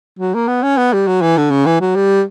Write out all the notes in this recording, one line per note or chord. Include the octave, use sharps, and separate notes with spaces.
F#3
A#3
B3
C#4
B3
G3
F#3
E3
D3
C#3
E3
F#3
G3